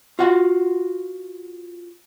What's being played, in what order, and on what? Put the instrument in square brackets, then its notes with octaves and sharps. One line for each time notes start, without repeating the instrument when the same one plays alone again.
[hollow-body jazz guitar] F4 F#4 F#5